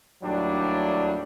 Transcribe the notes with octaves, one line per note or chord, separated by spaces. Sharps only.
D#2 A2 F#3 G3 D4